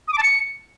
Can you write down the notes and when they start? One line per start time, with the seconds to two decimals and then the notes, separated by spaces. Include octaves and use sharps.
0.08 D#6
0.13 D6
0.18 A5
0.23 C#7